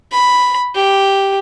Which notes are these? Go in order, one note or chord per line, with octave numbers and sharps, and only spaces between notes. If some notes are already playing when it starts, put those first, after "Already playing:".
B5
G4